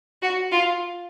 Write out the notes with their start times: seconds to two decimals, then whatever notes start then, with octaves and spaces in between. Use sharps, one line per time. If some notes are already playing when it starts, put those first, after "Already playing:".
0.23 F#4
0.52 F4